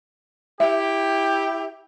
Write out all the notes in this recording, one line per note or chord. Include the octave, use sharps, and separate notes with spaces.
E4 G4 E5